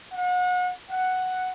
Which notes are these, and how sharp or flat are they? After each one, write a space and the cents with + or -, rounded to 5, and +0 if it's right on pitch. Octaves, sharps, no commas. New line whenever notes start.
F#5 -35
F#5 +0